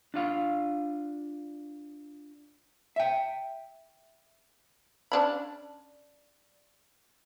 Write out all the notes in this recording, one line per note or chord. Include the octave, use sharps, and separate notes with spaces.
D4 F4 F5
E5 G5
C#4 D4 B5